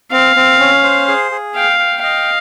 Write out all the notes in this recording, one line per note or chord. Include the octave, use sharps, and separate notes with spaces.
C4 F5
C4
C#4
C5
G#4
G#4
F5 G5
G5
D#5 F5